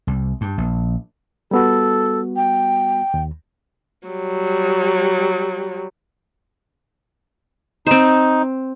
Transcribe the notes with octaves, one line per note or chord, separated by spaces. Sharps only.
C2
G2
A#1
G3 B3 F#4 A4
G5
D#2
F#3 G3
C4 D#4 C5